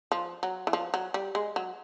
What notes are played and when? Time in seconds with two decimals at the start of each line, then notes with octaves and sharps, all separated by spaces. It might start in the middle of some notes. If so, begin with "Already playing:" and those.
0.12 F3
0.43 F#3
0.67 E3
0.73 F3
0.94 F#3
1.14 G3
1.35 G#3
1.56 F#3